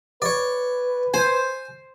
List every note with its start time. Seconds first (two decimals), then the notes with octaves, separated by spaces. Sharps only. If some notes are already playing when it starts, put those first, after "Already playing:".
0.22 B4 C#5 D5
1.14 C5 G#5